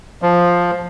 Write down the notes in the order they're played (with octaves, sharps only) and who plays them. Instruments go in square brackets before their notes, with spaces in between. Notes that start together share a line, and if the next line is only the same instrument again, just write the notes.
[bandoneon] F3